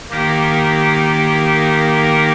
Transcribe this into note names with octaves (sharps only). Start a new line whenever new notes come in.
D#3 A#3 D#4 G4 A#4